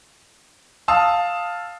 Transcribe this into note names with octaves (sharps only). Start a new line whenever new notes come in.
F5 A5 D#6 E6